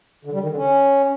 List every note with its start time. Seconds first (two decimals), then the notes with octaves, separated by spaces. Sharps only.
0.25 D3
0.33 G3
0.41 D#3
0.49 D3
0.57 C#4